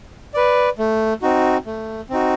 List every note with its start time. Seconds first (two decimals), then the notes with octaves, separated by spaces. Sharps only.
0.34 B4 D5
0.78 A3
1.22 C4 D#4 F#4
1.66 A3
2.10 C4 D#4 F#4